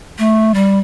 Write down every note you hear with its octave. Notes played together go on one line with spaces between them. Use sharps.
A3
G3